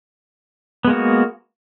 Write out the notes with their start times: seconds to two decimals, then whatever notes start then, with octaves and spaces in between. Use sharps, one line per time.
0.85 B3
0.87 G#3
0.90 A#3
0.93 F#4